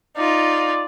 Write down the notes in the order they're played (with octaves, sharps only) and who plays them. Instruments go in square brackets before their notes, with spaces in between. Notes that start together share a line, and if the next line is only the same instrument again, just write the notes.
[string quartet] D#4 F4 [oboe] D5